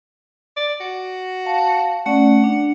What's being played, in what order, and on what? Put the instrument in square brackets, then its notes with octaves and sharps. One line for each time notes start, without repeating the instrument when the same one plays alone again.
[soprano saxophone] D5
F#4
[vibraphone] F5 A5
[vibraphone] A3 C#4 D5 [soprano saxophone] F#5
[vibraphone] D4